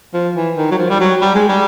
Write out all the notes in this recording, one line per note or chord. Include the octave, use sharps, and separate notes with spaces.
F3
E3
D#3
F#3
F3
G3
F#3
G3
G#3
G3